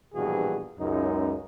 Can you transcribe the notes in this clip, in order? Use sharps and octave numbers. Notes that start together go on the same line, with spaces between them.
A#1 G2 B2 E3 F#4 G#4
C#2 F#2 D#4